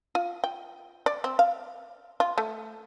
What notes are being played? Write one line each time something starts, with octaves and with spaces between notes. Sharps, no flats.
F4
G5
D5
C4
F5
F4
A3